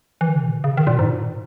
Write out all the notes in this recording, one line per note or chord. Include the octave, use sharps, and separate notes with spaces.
E3
D#3
C#3
B2
A#2
C#3
D#3
A#2
B2
G#2
A#2